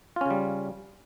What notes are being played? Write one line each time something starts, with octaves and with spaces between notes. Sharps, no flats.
C#3 G3 C#4 F4